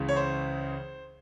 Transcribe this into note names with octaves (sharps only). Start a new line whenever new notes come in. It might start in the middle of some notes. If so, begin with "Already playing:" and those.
Already playing: C#2 C#3 E3
C#5
C5